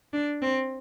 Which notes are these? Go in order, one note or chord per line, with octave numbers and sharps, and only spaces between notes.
D4
C4